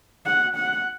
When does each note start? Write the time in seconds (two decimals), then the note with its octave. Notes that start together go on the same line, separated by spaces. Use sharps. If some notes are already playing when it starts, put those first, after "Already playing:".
0.25 F#5
0.56 F#5